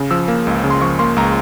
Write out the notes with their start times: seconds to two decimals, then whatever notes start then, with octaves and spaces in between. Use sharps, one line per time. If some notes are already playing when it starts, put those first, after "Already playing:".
Already playing: C#3
0.11 F3 E6
0.28 A#3
0.47 C#2
0.64 C#3
0.70 C6
0.81 F3 C#6
0.99 A#3 C6
1.16 C#2 A#5